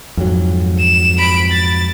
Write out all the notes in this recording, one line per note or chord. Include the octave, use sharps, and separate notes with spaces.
F2 G#2 F#3
E7
B5 D7
A6